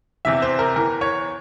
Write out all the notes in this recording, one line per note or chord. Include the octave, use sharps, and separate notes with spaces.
E2 C3 E3 E5
C5
A#4
E2 E3 A#4
C#5